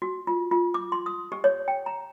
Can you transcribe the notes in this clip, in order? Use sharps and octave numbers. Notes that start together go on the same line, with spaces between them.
F#4
F4
F4
D6
C6
D#6
G4
C#5
G5
A#5